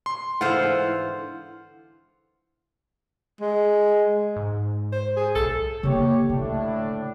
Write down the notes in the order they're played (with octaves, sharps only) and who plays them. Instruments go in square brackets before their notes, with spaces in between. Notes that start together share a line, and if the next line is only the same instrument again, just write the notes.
[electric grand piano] C6
[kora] G#2 D3 E3 [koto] F4 C5 [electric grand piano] F#5 F6
[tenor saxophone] G#3
[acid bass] G#2
[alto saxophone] C5
G#4
[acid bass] B1 [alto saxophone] A4
[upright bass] D3 A#3 [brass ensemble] G4 C#5
[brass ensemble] A2 D4 [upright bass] D3